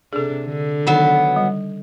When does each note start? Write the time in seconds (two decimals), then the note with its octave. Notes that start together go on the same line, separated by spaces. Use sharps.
0.13 C3 D4 G#4 A4
0.45 D3
0.87 D#3 F#3 B3 D#4
1.36 G3